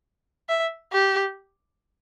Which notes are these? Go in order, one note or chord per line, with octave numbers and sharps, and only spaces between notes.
E5
G4